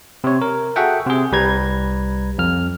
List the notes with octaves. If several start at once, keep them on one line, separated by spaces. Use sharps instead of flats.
C3 C#5
A#4
F#4 G#4 A4 E5 F#5 G5
C3 G#4
C2 G3 B4 A#5 G#6
F2 F6